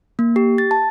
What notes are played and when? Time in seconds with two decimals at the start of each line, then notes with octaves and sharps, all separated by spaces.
0.19 A#3
0.36 G4
0.58 A6
0.71 A5